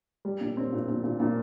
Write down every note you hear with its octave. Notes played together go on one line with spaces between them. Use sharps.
G3
A#2
C4
A#2
A#2
A#2
A#2